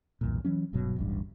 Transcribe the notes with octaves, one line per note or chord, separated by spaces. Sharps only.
B1 E2 G2 A#2
E3 F#3 A3 C#4
D#1 G2 B2 F#3
D1 A1 G2